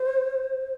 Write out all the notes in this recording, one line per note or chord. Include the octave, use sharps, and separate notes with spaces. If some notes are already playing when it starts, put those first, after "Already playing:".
Already playing: C5